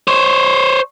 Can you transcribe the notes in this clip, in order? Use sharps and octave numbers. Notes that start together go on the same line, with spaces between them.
C5 C#5